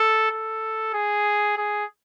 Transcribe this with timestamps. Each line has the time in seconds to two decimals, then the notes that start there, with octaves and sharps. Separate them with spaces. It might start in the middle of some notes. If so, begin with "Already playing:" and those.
Already playing: A4
0.31 A4
0.94 G#4
1.57 G#4